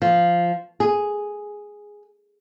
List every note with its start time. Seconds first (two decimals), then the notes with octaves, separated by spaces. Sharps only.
0.02 F3
0.80 G#4